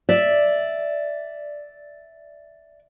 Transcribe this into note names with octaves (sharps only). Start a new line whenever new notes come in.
D5 E5